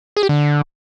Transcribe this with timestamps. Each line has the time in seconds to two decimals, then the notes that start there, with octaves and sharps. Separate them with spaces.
0.17 G#4
0.23 G4
0.29 D3